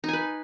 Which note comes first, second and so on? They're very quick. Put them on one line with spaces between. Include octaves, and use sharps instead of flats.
D#4 G#5 B4